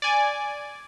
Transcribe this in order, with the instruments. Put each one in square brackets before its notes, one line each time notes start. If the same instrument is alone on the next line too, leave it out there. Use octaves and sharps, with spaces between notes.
[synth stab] D5 G#5